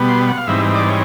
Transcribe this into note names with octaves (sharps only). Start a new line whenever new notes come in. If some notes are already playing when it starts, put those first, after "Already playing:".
Already playing: B2 G3 B3
C6
F#5
F5
G#2 E3 G3 C4 D#4 E5
D5
C#5